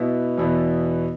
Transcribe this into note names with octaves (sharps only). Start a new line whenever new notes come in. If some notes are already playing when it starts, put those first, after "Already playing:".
Already playing: B2 B3 E4
E2 B2 B3 E4